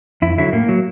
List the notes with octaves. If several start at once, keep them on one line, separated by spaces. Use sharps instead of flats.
F2 E4
D3 F#3 E4
A2 A#3
F#3